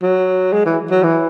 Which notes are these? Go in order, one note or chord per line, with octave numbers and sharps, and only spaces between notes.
F#3
G#3
E3
F#3
E3